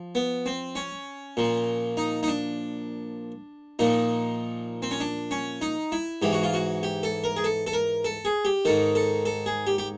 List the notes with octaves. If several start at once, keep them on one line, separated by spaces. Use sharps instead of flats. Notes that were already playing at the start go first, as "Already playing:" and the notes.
Already playing: F3
B3
C4
C#4
A#2 F3
D#4
D#4
D4
A#2 F3 D#4
C4
C#4
D4
C#4
D#4
E4
G#2 E3 G4
F#4
F4
F#4
G4
A4
A#4
G#4
A4
A4
A#4
A4
G#4
G4
G#2 D#3 A4
A4
A4
G#4
G4
G4